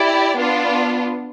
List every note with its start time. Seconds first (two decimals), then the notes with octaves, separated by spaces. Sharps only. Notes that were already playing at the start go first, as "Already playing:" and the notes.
Already playing: E4 G4 D5
0.38 B3 D4 F4